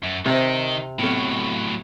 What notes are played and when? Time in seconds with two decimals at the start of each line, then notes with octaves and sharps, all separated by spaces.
0.04 F#2
0.26 C3 D#3 C4 D#4 C5
0.99 A2 F#3 B3 C4 A4